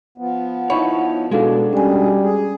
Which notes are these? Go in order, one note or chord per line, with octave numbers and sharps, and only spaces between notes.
F3 B3
D#4 E4 C#5 F#5 B5 C#6
B2 G#3 D4 F#4 A4 F5
B2 G3 C#4 G#4 G#5
G#4